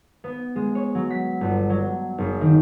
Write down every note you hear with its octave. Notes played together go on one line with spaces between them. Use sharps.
B3
G#3
C#5
F#3
B6
G1
F#3
F#1
D#3